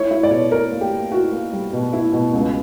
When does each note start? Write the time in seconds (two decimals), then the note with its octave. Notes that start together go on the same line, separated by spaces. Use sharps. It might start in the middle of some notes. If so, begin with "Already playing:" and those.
Already playing: E4 C#5
0.11 E4
0.23 D5
0.31 B2 C#5
0.51 E4 A#4
0.71 A#3
0.81 G4
0.91 A#3
1.12 E4 F#4
1.32 A#3
1.52 G3
1.73 B2
1.93 E4
2.12 B2
2.33 C#2